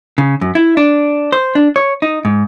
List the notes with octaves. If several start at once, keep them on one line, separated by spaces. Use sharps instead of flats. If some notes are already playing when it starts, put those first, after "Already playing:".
C#3
F#2
E4
D4
C5
D4
C#5
D#4
G#2